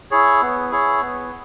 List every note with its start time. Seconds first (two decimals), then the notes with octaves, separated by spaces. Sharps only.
0.11 E4 G#4 C#5
0.42 B3
0.71 E4 G#4 C#5
1.01 B3